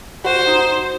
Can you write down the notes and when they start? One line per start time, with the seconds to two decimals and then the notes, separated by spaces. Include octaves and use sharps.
0.24 F#4 C5
0.47 D#4